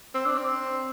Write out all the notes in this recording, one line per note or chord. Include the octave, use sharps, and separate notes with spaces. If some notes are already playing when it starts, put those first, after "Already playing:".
C4
D4
C4